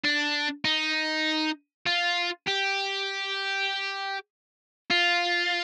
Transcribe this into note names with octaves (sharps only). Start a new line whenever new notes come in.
D4
D#4
F4
G4
F4